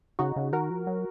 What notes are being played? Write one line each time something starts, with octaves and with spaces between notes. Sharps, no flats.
C#3 D#4 F#4
C#3
D#3 F#4 A#4
F3
F#3